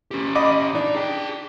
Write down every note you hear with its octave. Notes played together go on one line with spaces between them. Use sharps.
C#4 G4
D#5 B5 D6
D4 D#4
G#4 G5